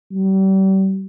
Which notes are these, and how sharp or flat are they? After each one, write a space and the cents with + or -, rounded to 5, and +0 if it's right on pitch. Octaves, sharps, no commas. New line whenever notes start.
G3 -35